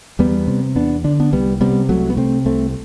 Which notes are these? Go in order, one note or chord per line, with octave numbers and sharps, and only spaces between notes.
E2 G3 B3
C3
E2 B3 D4
D3 D4
B3 D4
C2 G3 B3
C3 G3 B3
C2 F#3 A3
B3
C3 A3 C4
C2 A3 C4